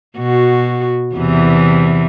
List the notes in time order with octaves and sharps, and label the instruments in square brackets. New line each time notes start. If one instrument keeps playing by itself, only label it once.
[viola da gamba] B2 F#4
E2 C3 E3